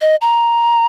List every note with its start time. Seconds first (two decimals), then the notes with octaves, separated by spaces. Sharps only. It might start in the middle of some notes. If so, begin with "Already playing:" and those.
0.01 D#5
0.21 A#5